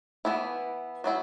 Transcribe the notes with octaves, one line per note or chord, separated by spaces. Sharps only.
E3 B3 E4
F#3 B3 E4